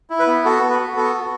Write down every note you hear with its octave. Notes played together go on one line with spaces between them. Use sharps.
E4
B4
B3
F#4 A4
B3
B4
F#4
B3 A4
F#4